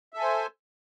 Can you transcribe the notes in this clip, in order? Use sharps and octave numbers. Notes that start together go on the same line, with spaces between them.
A4 C5 E5 G#5